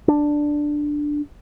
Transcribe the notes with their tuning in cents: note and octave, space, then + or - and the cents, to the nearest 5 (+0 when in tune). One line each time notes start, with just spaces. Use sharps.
D4 +5